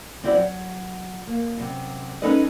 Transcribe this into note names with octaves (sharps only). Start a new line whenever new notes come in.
G3 C4 E4 F#4 B4 D5
F#3
A#3
F#2 C3
G#3 C#4 D#4 A4 B4 D#5